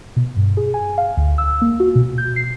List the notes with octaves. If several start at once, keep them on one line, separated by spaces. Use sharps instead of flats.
B2
G2
G#4
G#5
F5
D2
E6
A#3
F#4
B2
G6
C7